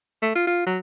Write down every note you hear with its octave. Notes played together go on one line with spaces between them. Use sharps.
A3
F4
F4
F#3